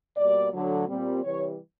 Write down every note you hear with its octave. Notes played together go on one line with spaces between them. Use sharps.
B2 G3 A#3 D5
D2 D3 F#3
A#2 G3 C4
C3 E3 G3 C#5